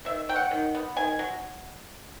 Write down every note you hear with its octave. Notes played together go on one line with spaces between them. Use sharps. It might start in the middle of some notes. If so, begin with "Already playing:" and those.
D#3 E5
F#3 G5
F#5
D#3
B3
D#3 G#5
F#3